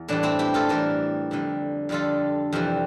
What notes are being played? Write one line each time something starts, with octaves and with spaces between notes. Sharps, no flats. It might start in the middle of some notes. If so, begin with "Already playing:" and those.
Already playing: E2
A2 E3 G3 D4
C4 E4
E4 G4
F4 A4
A2 E3 G3 G4 A#4
F2 D3 G3
F2 D3 G3 F4 A4
F2 C3 E3 G3